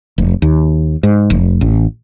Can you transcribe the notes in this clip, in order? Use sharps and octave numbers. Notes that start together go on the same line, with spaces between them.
F1
D#2
G#2
F1
A1